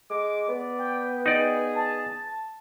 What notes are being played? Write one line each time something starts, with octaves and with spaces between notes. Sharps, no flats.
G#3 D6
B3 D5
G5
D#4 G#4 D5
A5